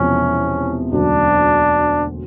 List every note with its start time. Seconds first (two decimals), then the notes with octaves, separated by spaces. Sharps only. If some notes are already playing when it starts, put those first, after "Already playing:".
Already playing: E1 E2 C3 F3 C#4
0.92 E1 D2 C#3 F#3 A#3 D4